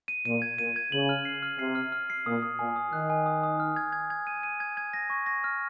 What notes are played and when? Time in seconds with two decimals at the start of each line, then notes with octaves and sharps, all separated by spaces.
0.08 D#7
0.25 A#2 D#7
0.42 G#6
0.58 A#2 D#7
0.76 G#6
0.92 C#3 F#7
1.09 F6
1.25 C7
1.43 F6
1.59 C3 C7
1.75 F6
1.92 F6
2.10 C7
2.26 A#2 D#6
2.43 D#6
2.59 A#2 G#5
2.76 D#6
2.93 D#3 F#6
3.10 G#5
3.26 D#6
3.43 D#6
3.60 F6
3.76 G#6
3.92 G#6
4.10 G#6
4.27 D#7
4.43 D#7
4.60 G#6
4.77 G#6
4.93 A#6
5.10 C#6
5.26 A#6
5.44 F6